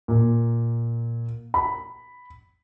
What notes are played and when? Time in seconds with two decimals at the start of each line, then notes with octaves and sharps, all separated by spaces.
0.08 A#2
1.54 B5